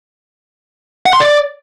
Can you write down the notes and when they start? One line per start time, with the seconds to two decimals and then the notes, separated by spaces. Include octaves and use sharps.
1.06 F#5
1.13 C6
1.20 D5